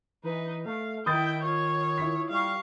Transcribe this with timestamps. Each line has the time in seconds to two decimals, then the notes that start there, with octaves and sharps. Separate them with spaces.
0.23 E3 D#4 B4
0.65 A3 F5
1.06 D#3 E4 G5 D#6 G6 A6
1.43 F4 C#5
1.98 E4 B6
2.30 G3 F5 C#6